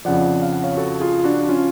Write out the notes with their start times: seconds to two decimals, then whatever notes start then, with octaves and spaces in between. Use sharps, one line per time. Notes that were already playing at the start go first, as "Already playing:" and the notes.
0.05 F2 C#3 F3 D5 F#5
0.42 F5
0.52 F#5
0.63 C#5 F5
0.77 F#4 A4
1.00 F4 G#4
1.24 D4 F#4
1.49 C#4 F4